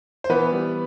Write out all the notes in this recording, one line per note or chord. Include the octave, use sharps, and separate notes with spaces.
C5
E3 B3 B4
G3